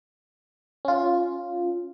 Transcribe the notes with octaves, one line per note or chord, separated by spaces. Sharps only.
C#4 F4